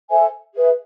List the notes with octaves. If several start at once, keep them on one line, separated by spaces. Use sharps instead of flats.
A4 C5 E5 G#5
G#4 B4 E5